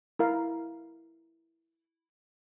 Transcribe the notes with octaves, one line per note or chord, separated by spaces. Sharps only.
E4 A#4 F5